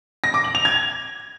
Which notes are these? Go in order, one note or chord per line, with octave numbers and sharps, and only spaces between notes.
A#6
D6
F#7
F7
G#6